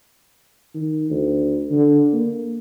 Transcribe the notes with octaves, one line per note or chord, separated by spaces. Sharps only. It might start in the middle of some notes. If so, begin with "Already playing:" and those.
D#3
D2
D3
A#3